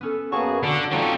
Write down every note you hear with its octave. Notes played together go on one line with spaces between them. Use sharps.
B3 C#4 A4
F#2 A#3 B3 F#4 G#4 C#5 A5 C#6
D3 D4 F#4
G3 C4 D#4 F4 A4 C#5